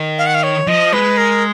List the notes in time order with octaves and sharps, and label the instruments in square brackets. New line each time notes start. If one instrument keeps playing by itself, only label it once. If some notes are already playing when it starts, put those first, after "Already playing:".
Already playing: [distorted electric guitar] D#3
[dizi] F5
F#5
F5
C#5
[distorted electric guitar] F3 [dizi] D#5
[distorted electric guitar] G#3 [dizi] B4
[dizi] A#4